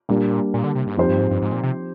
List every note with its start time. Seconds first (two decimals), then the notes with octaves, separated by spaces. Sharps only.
0.09 A#2 G3 A#3 D4
0.54 A#2
0.64 D3
0.75 C3
0.87 G#2
0.97 F2 F3 C4 D#4 G4 C5
1.09 G2
1.19 G#2
1.30 G2
1.42 G#2
1.52 A#2
1.63 C3